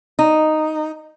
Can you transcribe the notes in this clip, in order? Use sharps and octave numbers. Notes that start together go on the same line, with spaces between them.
D#4